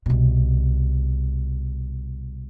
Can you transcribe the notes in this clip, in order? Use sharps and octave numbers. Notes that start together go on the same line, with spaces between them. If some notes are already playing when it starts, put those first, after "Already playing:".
C2 B2